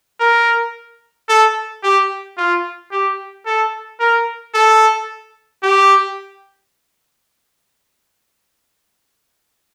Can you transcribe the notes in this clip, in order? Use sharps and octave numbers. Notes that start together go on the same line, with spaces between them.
A#4
A4
G4
F4
G4
A4
A#4
A4
G4